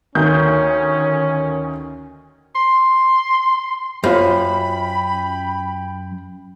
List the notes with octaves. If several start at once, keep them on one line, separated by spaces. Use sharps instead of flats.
D2 D#3 C#4 G6
C6
F#2 F4 C5 G5 B5